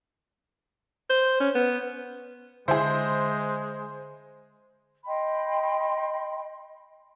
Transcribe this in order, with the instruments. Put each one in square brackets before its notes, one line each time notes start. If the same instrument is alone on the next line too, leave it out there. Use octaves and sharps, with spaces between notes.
[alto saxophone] C5
C#4
B3
[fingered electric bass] D3 [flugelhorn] G#3 [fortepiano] E4 G#4 [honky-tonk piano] C5
[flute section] D#5 G5 B5 C6